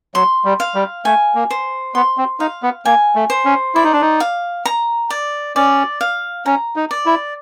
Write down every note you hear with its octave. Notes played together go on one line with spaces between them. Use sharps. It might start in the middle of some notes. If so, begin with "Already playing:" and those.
F#3 C6
G3
F5
G3
A3 G#5
A#3
C5
B3 C6
C4
D#4 F5
B3
A#3 G#5
A3
C5
C#4
E4 D5
D#4
D4
D#4
F5
A#5
D5
C#4 D5
F5
C#4 A#5
D#4
D5
E4